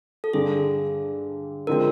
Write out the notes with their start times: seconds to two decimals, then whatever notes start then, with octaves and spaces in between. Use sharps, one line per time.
0.24 A4
0.33 G2 D3 G3 G#4
1.67 D3 F3 G#3 C4 A#4